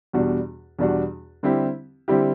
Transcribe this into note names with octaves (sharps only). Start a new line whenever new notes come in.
E2 B2 G3 D4 F#4
E2 B2 G3 D4 F#4
D3 G3 C4 E4 G4
D3 G3 C4 E4 G4